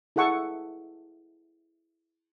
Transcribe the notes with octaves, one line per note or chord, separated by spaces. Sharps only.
E4 G#4 A4 F#5 C#6 E6